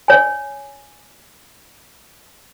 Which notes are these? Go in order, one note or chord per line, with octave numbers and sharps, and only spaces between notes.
C#5 G#5